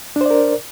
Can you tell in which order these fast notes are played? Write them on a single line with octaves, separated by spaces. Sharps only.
D4 C5 D5 A#4